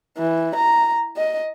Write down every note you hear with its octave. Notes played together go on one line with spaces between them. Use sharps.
E3
A#5
D#5